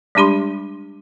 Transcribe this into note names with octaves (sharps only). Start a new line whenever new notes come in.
G3 G#3 D4 G4 B5 C6